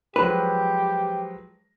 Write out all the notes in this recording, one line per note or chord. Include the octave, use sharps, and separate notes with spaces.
F3 F#3 G#3 G4 B4